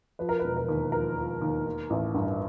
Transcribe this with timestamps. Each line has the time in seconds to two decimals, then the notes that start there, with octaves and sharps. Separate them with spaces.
0.19 F3 B4
0.29 A#4
0.39 E1 B4
0.57 A#4
0.69 D#2
0.92 F3 A#4
1.18 F3
1.41 D#2
1.65 D#3
1.90 A1
2.14 G2